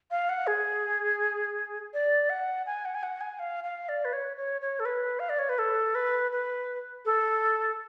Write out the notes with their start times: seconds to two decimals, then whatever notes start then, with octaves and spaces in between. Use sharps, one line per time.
0.11 F5
0.29 F#5
0.47 G#4
1.94 D5
2.30 F#5
2.66 G#5
2.85 F#5
2.95 G#5
3.03 F#5
3.21 G#5
3.39 F5
3.64 F5
3.89 D5
4.05 B4
4.13 C#5
4.37 C#5
4.61 C#5
4.80 A4
4.85 B4
5.20 F5
5.29 D5
5.39 C#5
5.49 B4
5.59 A4
5.95 B4
6.32 B4
7.05 A4